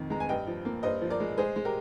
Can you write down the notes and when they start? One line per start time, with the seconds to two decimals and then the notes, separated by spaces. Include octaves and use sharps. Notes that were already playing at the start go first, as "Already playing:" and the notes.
Already playing: F2 D#3
0.10 G#3 A#5
0.20 G#5
0.29 G2 D#5 G5
0.47 F3
0.65 A#3
0.83 G2 C5 D#5
1.02 F3
1.10 A#4 D5
1.20 G#3
1.38 G#3 G#4 C5
1.56 G#3
1.65 G4 A#4